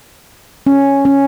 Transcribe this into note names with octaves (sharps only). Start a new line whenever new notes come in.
C#4
C#4